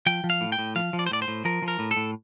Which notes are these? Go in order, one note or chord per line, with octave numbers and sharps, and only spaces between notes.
F3 G5
F3
F5
A2
G5
A2
F3 F5
F3
D5
C5
A2 D5
C5
A2
F3 A#4
F3
A#4
A2
A4
A2